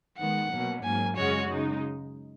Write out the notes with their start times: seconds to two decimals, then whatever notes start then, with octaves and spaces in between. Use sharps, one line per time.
0.18 D#3 G#3 B3 F#5
0.52 B2 F#3 A#3 C#4
0.84 G#2 F#3 A#3 G#5
1.17 F#2 C#3 G#3 C#4 F#4 C#5
1.49 C#3 G#3 D#4